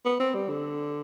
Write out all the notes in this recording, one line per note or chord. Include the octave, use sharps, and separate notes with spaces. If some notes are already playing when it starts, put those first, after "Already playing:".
B3
C4
G3
D3